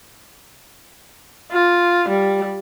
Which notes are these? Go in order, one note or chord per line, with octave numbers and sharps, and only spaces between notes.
F4
G3